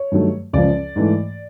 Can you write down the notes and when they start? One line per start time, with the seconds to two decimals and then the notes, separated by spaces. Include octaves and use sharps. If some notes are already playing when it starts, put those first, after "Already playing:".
Already playing: C#5
0.12 G2 D#3 F#3 A3
0.53 C#2 C#3 F3 D5
0.96 G#2 E3 A3